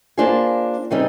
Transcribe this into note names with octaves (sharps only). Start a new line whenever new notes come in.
A#3 D4 F4 G#4 C5
C#3 E3 G3 C4 D#4